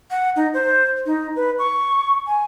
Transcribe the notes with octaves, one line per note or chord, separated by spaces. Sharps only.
F#5
D#4
C5
D#4
B4
C#6
G#5